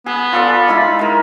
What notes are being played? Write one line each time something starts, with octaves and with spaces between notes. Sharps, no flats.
B3 G#4
F4 A4 D5
B5
G#3 D#4 E4
G#3 A#4